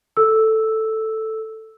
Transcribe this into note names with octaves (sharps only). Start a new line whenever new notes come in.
A4 E6